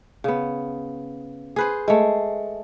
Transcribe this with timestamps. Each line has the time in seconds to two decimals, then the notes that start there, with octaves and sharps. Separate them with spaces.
0.24 C#3 B3
1.56 G#4 B4 C5
1.88 G#3 A3